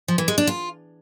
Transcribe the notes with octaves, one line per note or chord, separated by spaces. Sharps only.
F3
E3
G#3
D4
F4